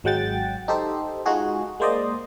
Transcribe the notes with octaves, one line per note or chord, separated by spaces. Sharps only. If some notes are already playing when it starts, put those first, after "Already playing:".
G#1 F#3 G#3 F#5 G5 A6
D#4 G4 A4 C5
G#3 D#4 F4 F#4 G#4
G#3 A#3 C5 D5 D#5